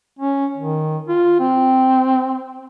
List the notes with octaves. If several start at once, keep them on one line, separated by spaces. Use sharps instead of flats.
C#4
D#3
F4
C4